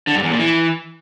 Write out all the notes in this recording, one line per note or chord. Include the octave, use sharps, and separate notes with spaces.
D3
G2
E2
A#2
E3